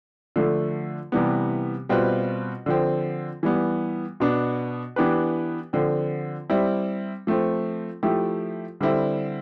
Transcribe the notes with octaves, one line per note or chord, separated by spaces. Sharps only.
D3 F3 A3
C3 E3 G3 B3
B2 G3 C4 F4 B4
D3 F3 C4
E3 G3 B3
B2 B3 D4
E3 B3 D4 G4 B4
D3 F3 C4
G3 C4 E4
F3 A3 C4
F3 A3 E4 G4
D3 G3 C4 E4